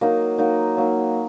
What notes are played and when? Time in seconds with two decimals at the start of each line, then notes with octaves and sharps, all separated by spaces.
0.01 F#3 A#3 D#4
0.38 F#3 A#3 D#4
0.77 F#3 A#3 D#4